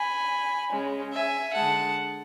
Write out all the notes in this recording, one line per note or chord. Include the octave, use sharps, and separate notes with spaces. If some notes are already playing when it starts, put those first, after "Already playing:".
Already playing: G#5 B5
C#3 G#3
E5 G#5
D3 G#3 F#5 A5